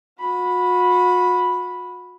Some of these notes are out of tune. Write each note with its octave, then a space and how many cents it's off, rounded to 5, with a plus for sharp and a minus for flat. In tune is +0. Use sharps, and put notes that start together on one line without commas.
F#4 -40 B5 +0